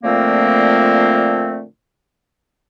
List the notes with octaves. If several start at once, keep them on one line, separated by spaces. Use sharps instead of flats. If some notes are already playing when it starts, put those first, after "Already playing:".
A#2 D3 F3 A3 A#3 C4